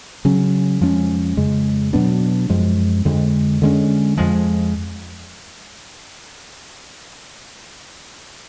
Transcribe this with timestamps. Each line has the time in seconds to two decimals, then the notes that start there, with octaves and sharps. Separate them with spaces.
0.25 C#3 F#3 C#4
0.81 F2 F3 G#3 C#4
1.37 F2 C#3 G#3
1.93 B2 F#3 B3 D4
2.49 F#2 F3 G#3
3.05 F2 D3 G#3
3.62 D3 G#3 C#4
4.17 F2 F3 G#3